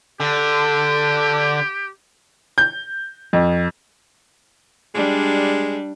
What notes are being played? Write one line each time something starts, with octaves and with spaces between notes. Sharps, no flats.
D3 G4
G6
F2
G3 G#3 D4